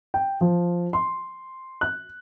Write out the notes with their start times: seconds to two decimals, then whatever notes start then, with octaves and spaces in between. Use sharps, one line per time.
0.14 G5
0.41 F3
0.93 C6
1.81 F#6